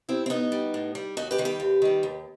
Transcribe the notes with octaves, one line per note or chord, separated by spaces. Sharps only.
G3 C4 E4
C4
A2 B3 D#4
G3
A2
G3
D#2 D#4 F#4
G4 B4
D#3 G3
G4 B4
D#2
D#3 G3
D#2